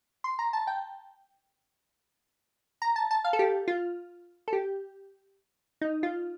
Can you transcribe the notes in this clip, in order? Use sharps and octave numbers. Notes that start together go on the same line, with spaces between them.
C6
A#5
A5
G5
A#5
A5
A5
F5
A4
G4
F4
A4
G4
D#4
F4